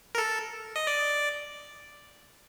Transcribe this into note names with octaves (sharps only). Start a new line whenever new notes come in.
A#4
A4
D#5
D5